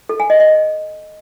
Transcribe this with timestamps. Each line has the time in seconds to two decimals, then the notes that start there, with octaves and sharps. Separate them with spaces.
0.09 A4
0.20 G#5
0.30 D#5
0.40 D#5